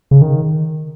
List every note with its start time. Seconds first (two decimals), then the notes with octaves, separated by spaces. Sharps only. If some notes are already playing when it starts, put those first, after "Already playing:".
0.11 C#3
0.22 D#3